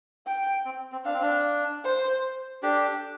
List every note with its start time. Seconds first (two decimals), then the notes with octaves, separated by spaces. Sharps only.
0.26 G5
0.65 C4
0.92 C4
1.05 D4 F5
1.14 C4
1.22 D4
1.84 C5
2.63 D4 G4 A4